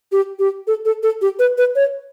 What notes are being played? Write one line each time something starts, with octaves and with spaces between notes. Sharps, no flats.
G4
G4
A4
A4
A4
G4
B4
B4
C#5